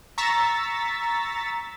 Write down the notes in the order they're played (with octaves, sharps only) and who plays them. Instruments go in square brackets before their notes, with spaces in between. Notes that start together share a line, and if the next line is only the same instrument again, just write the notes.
[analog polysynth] A#5 C#6 E6 A6 B6